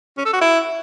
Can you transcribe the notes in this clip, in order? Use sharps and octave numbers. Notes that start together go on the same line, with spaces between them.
C#4
A4
F#4
E4